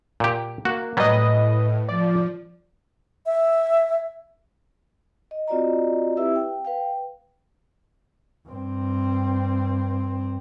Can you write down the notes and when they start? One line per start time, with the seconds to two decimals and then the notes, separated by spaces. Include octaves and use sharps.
0.20 A#2 G4
0.65 A#3 F#4
0.97 A2 F#3 G3 B4 D#5
1.89 F3 D5
3.26 E5
5.31 D#5
5.48 C4 F4 F#4 D5 D#5 A#5
6.17 C4 E4 G4 B4 E5 E6
6.36 G5
6.65 B4 F5 G5
8.48 G2 C4